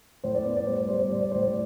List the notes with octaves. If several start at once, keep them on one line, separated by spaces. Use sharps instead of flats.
A2 C5
D5
B3 C5
D5
G3 C5
D5
G3 C5
D5
A2 C5
D5
A2 C5
D5